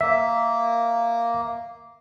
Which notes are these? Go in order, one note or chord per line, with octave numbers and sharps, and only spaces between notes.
A#3 E5